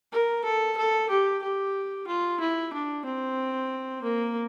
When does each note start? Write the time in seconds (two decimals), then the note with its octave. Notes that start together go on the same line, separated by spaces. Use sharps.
0.12 A#4
0.45 A4
0.77 A4
1.10 G4
1.43 G4
2.07 F4
2.40 E4
2.73 D4
3.05 C4
4.03 A#3